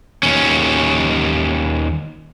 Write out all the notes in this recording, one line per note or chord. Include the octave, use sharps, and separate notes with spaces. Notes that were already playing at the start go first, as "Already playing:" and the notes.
D#2 C#4